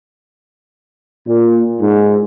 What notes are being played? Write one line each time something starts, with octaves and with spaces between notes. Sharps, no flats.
A#2
G#2